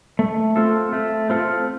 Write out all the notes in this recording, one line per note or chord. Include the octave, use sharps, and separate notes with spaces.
A3
C4 F4 A4
A3
C4 F4 A4